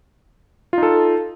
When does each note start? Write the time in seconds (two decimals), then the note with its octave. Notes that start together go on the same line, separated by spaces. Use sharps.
0.73 F4
0.78 D#4
0.83 A4